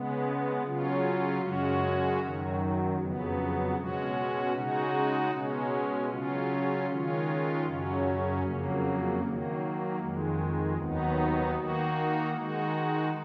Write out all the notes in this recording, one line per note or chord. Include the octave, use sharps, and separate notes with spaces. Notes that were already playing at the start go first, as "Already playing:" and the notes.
Already playing: C#3 G#3 B3
C#3 F#3 C#4 F4
F#2 C#3 G#3 C#4 F#4
F#2 D#3 F#3
F2 C#3 F#3 B3
B2 G#3 C#4 F#4
C#3 G#3 D#4 F#4
B2 G#3 C#4
C#3 F#3 C#4 F4
D#3 G#3 C#4 F4
F#2 C#3 F#3 C#4
F2 C#3 F#3 A#3
D#3 F#3 A#3
F2 D#3 G#3
D#2 D#3 F#3 B3 D#4
D#3 A#3 D#4 F#4
D#3 G#3 D#4 F#4